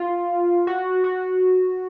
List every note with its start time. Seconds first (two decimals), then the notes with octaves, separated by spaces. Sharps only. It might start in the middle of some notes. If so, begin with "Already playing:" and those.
Already playing: F4
0.67 F#4
1.04 F#4